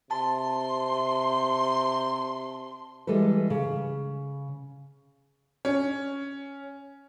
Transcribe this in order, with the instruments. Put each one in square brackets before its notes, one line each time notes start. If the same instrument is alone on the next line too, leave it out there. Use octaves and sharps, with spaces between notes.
[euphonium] C3 [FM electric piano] A5 [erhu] C6
[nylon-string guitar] E3 G3 G#3 A4 B4
C#3
[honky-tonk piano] C#4